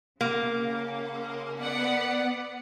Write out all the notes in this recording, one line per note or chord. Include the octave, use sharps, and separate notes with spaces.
C#3 A#3
B3 D5 F#5